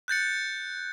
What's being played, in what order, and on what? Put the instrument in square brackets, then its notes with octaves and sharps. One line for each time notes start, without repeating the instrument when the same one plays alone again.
[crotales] F#6 G6 A6 C#7